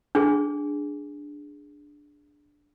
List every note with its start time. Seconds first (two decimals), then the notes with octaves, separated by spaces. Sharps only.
0.15 D4 G#4